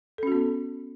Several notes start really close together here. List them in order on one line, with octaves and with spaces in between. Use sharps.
A4 C#4 F#4 B3